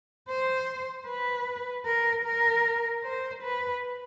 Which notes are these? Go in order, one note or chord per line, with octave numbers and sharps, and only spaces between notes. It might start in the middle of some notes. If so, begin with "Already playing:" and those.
C5
B4
A#4
A#4
C5
B4